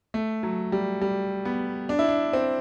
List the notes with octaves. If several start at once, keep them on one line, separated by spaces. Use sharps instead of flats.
A3
F#3
G3
G3
B3
D4
E4
D4
C4